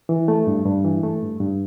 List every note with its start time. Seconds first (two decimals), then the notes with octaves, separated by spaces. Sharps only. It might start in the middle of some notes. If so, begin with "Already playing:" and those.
0.09 E3
0.28 A3
0.47 G2
0.66 G2
0.85 E3
1.03 A3
1.22 G2
1.40 G2